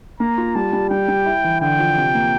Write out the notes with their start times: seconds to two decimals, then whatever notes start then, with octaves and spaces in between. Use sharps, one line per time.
0.20 A#3 A#5
0.38 F4
0.55 G3 A5
0.73 G3
0.90 G3 G5
1.08 G3
1.26 E4
1.44 E3
1.61 D3 G5
1.79 F3
1.97 C3
2.15 A#3